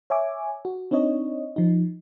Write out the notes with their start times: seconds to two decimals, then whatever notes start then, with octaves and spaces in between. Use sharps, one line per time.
0.10 C#5 E5 G#5 D6
0.65 F#4
0.91 C4 D4 D#4 C#5 D#5
1.56 F3 D#4